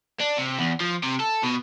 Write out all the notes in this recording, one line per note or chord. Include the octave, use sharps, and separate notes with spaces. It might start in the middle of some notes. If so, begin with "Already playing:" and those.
D4
C3
E2
F3
C3
A4
B2